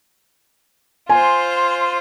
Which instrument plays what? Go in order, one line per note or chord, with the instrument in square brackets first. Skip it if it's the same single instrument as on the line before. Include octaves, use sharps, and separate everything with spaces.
[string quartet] F4 C5 [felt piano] G#5